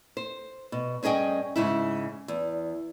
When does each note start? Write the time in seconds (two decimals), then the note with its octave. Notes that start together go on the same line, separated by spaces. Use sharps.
0.17 C5
0.72 B2
1.03 G2 C#4 G#4 D#5 G5
1.56 G#2 C#3 E4
2.28 E2